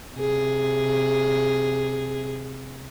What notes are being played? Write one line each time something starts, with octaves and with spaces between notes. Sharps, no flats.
C3 G#4